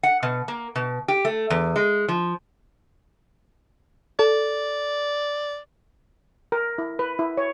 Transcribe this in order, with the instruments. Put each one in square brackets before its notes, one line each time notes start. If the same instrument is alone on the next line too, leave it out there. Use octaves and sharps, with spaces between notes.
[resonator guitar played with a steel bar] F#5
B2
A#3
B2
G4
A3
E2
G#3
F3
[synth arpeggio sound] A4 [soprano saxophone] D5
[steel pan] A#4
E4
B4
E4
C#5